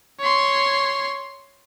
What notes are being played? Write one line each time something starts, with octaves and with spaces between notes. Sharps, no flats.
C#5 C6